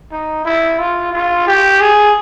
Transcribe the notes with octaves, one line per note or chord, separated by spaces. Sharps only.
D#4
E4
F4
F4
G4
G#4